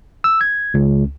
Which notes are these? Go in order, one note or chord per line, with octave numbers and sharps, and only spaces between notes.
E6
G#6
C#2